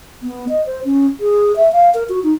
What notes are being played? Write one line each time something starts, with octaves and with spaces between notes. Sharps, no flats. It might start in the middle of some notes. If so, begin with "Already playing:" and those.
B3
D#5
C5
C#4
G#4
E5
F5
A#4
F#4
D#4